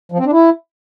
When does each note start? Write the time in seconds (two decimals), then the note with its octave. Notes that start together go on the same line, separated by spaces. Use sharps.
0.12 F3
0.19 C4
0.26 D4
0.33 E4